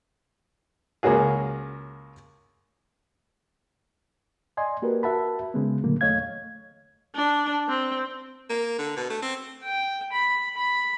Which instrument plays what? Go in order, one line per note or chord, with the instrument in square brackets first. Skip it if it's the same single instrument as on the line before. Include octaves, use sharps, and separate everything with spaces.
[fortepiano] C#2 A#3 C#4 F#4 G#4
[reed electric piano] D5 D#5 G#5 C6
A#3 F#4 G4 A#4 B4
F#4 A#4 E5 F#5 A5 B5
C#3 G#3 B3
A#2 D3 F#3 A3 A#3
E2 A3 C#5 D#5 F5 G#6
[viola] D4
C4
[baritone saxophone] A#3
D3
B2
A3
C4
[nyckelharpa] G5
B5
B5